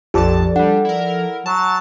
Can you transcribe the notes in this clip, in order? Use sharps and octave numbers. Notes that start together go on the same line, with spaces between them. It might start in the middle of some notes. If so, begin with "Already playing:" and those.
A#1 F2 F3 G4 A4 D5 A5
G3 D4 F#5
E4 A#4
F#3 A5